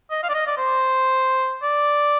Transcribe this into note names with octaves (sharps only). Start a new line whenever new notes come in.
D#5
F5
D5
D#5
D5
C5
D5